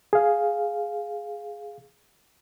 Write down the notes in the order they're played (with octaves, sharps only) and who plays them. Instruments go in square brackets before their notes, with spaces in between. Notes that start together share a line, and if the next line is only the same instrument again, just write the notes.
[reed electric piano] G#4 F5